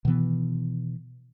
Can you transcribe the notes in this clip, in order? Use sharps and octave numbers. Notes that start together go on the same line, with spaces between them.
B2 D#3 E3 B3